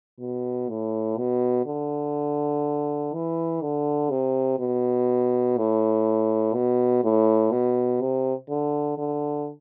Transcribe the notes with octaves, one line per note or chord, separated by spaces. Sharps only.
B2
A2
B2
D3
E3
D3
C3
B2
A2
B2
A2
B2
C3
D3
D3